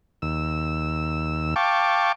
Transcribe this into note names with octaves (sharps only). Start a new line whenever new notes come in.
D#2 E6
F5 G5 A5 C#6 D6